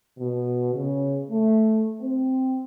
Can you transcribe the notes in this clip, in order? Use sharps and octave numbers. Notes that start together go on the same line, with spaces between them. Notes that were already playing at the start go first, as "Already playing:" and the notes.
B2
C#3
A3
C4